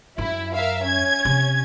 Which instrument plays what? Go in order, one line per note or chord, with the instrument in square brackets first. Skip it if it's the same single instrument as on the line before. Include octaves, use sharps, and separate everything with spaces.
[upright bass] F#2 [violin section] E4
[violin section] A#4 E5 F5
C#4 G#6
[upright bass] C3